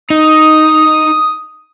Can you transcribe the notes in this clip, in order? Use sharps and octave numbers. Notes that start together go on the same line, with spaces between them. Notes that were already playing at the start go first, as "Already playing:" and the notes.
D#4 D#6